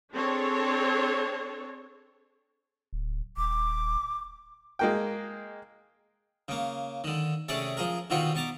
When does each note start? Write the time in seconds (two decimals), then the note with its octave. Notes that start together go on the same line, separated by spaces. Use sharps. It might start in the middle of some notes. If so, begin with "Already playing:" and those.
0.13 C4 D4 G#4 A4 C#5
2.93 D1
3.37 D#1 D6
4.79 G#3 A#3 G5
6.48 C#3 A#3
7.04 D3 D#3
7.48 C3 A3 C#4 G#4 D5
7.77 F3 G#4 A#4
8.10 B2 D3 D#3 C4 F4 F#4
8.35 B2 A5 A#5 D6